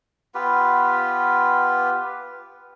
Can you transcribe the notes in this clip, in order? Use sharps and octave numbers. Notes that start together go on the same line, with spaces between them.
B3 F4 G4 B4